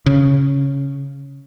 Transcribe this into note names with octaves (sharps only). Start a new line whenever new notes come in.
C#3